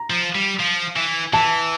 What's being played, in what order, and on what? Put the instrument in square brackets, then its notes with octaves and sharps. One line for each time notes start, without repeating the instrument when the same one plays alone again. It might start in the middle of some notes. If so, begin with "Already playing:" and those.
Already playing: [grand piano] A#5
[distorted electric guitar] F3
G3
F3
E3
[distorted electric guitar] E3 [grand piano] A5